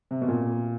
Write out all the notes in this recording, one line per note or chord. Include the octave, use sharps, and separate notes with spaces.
C3
B2
A#2